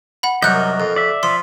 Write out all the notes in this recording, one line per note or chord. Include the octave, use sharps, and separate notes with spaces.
F#5 B5
C2 F#2 F#3 A#4 D#5 F#5 F#6 G6
F2
D5 E5
F3 C6